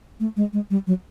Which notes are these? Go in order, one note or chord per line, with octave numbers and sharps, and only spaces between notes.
A3
G#3
G#3
G3
F#3